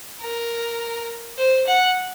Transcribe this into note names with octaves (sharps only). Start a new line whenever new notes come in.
A#4
C5
F#5